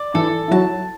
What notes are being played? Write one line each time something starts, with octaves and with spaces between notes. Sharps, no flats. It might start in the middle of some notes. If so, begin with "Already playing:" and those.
Already playing: D5
E3 E4 A4
E4
F#3 F#4 A5